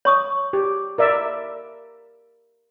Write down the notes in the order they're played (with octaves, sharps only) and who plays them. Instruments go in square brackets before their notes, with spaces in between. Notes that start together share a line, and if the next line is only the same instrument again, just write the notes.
[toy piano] C#5 C#6 D#6
[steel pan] G4
A#4 D5 E5